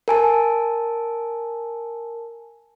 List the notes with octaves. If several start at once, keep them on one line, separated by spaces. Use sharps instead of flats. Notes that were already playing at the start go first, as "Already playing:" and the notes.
A#4 G#5 A5